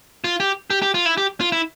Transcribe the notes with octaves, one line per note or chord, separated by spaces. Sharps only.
F4
G4
G4
G4
F4
E4
G4
F4
E4